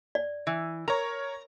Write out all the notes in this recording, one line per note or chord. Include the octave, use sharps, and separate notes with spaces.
D5
E3
A#4 C#5 A#5